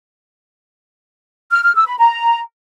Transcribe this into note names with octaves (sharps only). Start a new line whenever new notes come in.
F6
F6
E6
B5
A#5